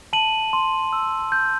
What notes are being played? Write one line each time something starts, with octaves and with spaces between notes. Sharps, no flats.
A5 D#7 F#7
C6
E6
G6